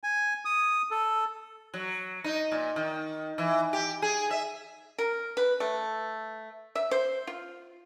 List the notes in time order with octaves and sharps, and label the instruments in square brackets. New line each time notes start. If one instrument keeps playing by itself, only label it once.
[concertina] G#5
D#6
A4
[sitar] F#3
D#4
A#2
D#3
E3
G4
G#4
E5
[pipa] A#4
B4
A3
E5
C5
F4